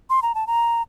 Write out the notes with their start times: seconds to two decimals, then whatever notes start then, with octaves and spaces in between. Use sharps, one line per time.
0.10 C6
0.22 A#5
0.35 A5
0.47 A#5